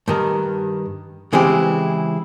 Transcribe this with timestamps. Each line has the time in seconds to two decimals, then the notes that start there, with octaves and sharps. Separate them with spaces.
0.08 G2 D#3 A#4
1.33 C#3 E3 G#3 C4 E4 G4